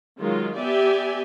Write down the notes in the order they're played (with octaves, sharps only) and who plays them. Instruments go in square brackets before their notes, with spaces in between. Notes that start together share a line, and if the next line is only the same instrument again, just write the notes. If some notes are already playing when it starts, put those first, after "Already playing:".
[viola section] D#3 F#3 G#3 F4
B3 G4 D5 E5 G#5